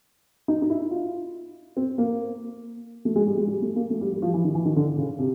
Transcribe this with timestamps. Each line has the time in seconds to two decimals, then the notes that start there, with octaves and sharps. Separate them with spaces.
0.48 D#4
0.62 D#4
0.70 E4
0.91 F4
1.77 C4
1.98 A#3
3.05 A3
3.16 G#3
3.27 G3
3.37 G#3
3.48 G3
3.62 A3
3.76 A#3
3.90 A3
4.01 G3
4.12 G3
4.22 F3
4.34 E3
4.44 D#3
4.55 E3
4.65 D#3
4.76 D3
4.98 C#3
5.19 C3